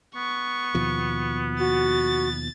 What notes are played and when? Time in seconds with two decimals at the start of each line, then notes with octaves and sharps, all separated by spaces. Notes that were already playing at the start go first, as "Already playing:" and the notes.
0.16 B3 C#6
0.75 D#2 B2 F3
1.59 F#4 A6